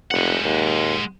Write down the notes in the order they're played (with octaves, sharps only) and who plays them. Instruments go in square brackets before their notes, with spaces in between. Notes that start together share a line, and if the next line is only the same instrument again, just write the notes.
[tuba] F1 [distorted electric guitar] G#3 F#5
[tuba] D#2